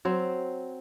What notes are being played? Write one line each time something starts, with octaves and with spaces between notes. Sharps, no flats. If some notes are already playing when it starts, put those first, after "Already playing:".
F#3 C4 C5